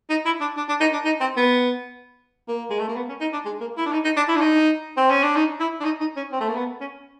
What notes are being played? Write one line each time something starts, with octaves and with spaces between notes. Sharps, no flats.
D#4
E4
D4
D4
D4
D#4
D4
D#4
C4
B3
A#3
G#3
A3
A#3
B3
C#4
D#4
D4
G#3
A#3
E4
D4
D#4
D#4
D4
E4
D4
D#4
C4
C#4
D4
D#4
E4
D4
D#4
D#4
C#4
C4
A3
A#3
B3
C#4